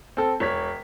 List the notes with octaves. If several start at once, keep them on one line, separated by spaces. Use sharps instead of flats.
C4 A4
E1 C#5 B6